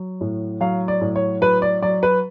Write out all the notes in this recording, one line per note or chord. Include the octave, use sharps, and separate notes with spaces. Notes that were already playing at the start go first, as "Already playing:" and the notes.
Already playing: F#3
A2
F#3 F5
D5
A2
C#5
F#3 B4
D5
F#3 D5
B4